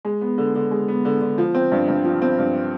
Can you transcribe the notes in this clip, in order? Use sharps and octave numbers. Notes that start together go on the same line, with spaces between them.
G#3
B3
D3
D3
G#3
B3
D3
D3
F3
C4
G2
G2
F3
C4
G2